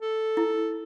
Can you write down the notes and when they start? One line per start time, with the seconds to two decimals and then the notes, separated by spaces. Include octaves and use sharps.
0.01 A4
0.37 E4